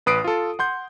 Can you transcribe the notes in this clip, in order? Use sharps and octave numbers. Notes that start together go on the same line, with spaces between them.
A1 B4 D#6 C7 D7
F4 A4
F#5 C6 G6